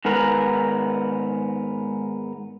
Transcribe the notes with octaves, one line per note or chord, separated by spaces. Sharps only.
G#2 D#3 B3 A#4 B4